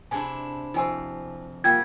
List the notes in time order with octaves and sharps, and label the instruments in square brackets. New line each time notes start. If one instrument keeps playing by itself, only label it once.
[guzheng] C3 D4 E4 [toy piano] G#4 D5 G#5
[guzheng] F2 [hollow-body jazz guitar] E4 F#4 C5 [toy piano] D#5 G#5 E6
[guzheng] G3 [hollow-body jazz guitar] A#3 F4 [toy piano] F#5 G5 E6 [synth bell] G#6